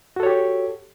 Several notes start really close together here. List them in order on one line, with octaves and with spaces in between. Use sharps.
F#4 A4 C#5 G4